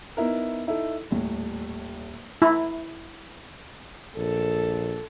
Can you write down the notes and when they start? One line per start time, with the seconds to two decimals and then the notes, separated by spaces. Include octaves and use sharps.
0.17 B3 D#4 E4 A#4
0.67 D#4 E4 A4
1.11 D#1 A2
2.42 E4
4.17 A#1 A4